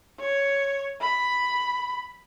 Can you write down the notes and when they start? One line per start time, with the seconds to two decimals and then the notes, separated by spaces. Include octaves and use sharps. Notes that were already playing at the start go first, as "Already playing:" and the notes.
0.20 C#5
1.01 B5